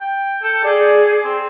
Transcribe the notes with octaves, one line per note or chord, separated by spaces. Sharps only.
G5
A4 G6
G#4 D5
C4